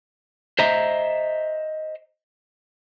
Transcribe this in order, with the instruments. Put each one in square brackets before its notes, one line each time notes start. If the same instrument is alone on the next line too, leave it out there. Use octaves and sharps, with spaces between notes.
[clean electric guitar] C5 D#5 E5 A#5